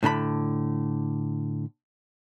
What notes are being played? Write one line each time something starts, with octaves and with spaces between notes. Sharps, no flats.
A2 D3 D4 B5